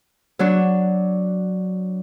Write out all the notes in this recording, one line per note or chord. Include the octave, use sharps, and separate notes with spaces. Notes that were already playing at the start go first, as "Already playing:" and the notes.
F#3 D4 F#4